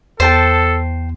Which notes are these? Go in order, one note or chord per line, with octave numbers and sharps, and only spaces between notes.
E2 A4 C5 G5 A5